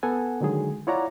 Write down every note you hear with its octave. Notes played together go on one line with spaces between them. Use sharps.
B3 A4 F#5 G#5
D3 D#3 F#3 G#3 G#4
E4 F4 C#5 D5 F#5 A#5